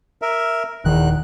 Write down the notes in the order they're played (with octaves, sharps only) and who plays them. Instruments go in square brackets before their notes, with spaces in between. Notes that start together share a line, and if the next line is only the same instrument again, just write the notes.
[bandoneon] A#4 E5
[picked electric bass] D#1 D#3 [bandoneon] E2 F#6